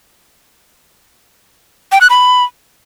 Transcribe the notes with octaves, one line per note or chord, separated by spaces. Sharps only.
G5
F#6
B5